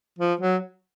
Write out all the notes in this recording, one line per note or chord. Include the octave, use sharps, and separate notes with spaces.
F3
F#3